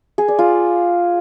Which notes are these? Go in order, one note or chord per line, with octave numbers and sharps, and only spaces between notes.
G#4
D5
F4